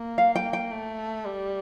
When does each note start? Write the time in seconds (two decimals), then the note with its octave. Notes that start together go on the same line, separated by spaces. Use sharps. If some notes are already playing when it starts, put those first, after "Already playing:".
Already playing: A#3
0.18 F5
0.35 G5
0.53 G5
0.71 A3
1.25 G3